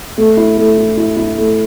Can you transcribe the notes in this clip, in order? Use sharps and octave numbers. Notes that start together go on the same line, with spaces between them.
A3
E4
A3
E4
E4
E4
A3